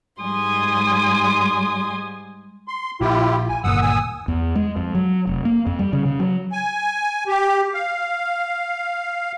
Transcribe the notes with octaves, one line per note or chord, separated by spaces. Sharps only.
G#2 G3 G#3 G#5 C6 D#6
C6
A#1 E4 F4 G4
G#5
G1 D#2 A#2 F#5 D#6 E6
G#5 D#6 E6
E2
G#3
F2
F#3
F1
A#3
F2
G3
C#3
C#3
F#3
G#5
G4
F5